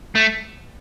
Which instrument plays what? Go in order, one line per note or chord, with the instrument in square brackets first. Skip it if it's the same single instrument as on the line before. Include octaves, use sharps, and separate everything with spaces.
[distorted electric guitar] A3